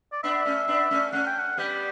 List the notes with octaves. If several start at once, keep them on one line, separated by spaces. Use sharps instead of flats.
D5
B3 D4 E5
A3 C#4
B3 D4
A3 C#4
A3 C#4 F#5
G5
F#5
G3 B3 G4